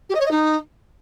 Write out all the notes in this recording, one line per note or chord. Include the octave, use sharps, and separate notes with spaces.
G4
D#5
C#5
D#5
D#4